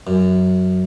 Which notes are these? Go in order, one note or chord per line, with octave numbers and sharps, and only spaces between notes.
F#2